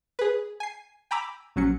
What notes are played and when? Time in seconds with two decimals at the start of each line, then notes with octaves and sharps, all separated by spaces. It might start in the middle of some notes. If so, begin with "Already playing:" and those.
0.19 G#4 B4
0.60 G#5 C7
1.11 G5 G#5 A#5 B5 D6 E6
1.56 A#1 F#3 C#4 C#7